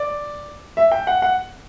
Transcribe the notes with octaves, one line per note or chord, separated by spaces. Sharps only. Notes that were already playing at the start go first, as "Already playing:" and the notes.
Already playing: D5
E5
G5
F#5
F#5